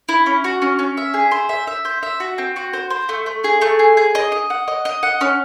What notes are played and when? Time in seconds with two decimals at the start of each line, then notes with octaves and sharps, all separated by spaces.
0.09 E4
0.26 C#4
0.44 F#4
0.62 C#4
0.79 C#4
0.97 E5
1.14 G#4
1.31 C5
1.49 E5
1.67 E5
1.85 C5
2.03 E5
2.20 F#4
2.38 C4
2.56 F#4
2.73 C5
2.90 C5
3.09 A3
3.26 A3
3.44 G#4
3.62 A3
3.79 G#4
3.97 G#4
4.15 D#5
4.32 D#5
4.50 F#5
4.68 D#5
4.85 D#5
5.03 F#5
5.21 C#4